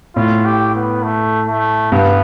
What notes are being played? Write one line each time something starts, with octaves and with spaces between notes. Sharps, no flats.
A2 F4
G4
B3
A3
A3
G2 B3